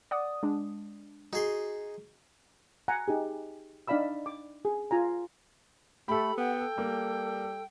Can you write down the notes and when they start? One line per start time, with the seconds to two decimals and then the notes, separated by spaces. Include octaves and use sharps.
0.11 D5 F#5 D#6
0.43 G#3 D4
1.33 D#4 F#4 G#4 C6
2.88 F#5 G#5 A#5
3.08 D#4 G4 G#4
3.88 D4 D#4 D5 F5 B5 E6
4.26 D6
4.65 G#4
4.91 F4 G#5 A#5
6.08 A3 G4 A4 B5
6.38 B3 F#5 G5
6.58 A4
6.78 G3 A#3